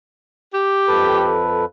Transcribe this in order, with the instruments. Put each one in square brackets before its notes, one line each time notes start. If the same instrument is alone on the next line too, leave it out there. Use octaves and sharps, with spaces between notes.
[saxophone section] G4
[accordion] F2 A4 B4